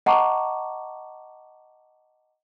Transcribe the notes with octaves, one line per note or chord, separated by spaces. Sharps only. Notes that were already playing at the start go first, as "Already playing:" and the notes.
D#5 F#5 A5 A#5 C#6 D6